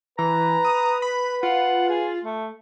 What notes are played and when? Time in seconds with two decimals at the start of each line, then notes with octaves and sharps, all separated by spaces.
0.18 E3 B4 A#5
0.65 D#6
1.02 B5
1.43 F4 F#5
1.89 G#4
2.24 A3